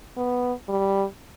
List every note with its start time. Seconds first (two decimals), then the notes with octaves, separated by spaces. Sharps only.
0.17 B3
0.68 G3